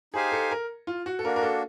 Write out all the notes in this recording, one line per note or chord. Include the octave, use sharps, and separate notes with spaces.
D#4 G4 G#4 C5 F5 G#5
A4
A#4
F4
F#4
A4
A#3 D4 F#4 A#4
A#4
A4